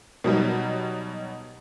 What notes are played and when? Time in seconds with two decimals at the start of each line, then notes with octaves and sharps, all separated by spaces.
0.24 B2 F#3 G3 D#4